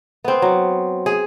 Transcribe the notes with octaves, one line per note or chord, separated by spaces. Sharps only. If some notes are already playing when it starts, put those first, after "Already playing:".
B3 C4
F#3
G#4